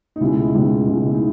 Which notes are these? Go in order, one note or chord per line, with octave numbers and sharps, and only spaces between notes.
D#4
C#2 B2 G#3 E4
C#2 B2 G#3 D#4
C#2 B2 G#3
E4
D#4